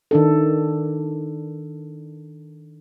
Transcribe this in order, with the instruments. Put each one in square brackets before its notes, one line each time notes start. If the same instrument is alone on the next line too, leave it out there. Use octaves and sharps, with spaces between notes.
[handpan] D#3 D4 A4